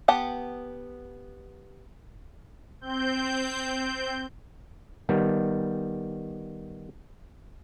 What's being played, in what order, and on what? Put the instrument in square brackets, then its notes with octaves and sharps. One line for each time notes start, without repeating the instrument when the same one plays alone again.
[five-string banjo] B3 G4 F#5 A5
[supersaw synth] C4 G6
[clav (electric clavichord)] D#3 G3 B3